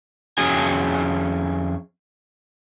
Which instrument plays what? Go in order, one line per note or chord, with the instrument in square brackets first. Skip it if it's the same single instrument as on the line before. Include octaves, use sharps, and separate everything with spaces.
[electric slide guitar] F2 C#4 F#4 G#4 G#5